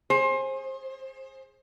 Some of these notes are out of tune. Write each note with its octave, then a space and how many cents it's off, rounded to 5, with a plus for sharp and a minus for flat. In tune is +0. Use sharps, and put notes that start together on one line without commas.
G#4 +0 C5 +30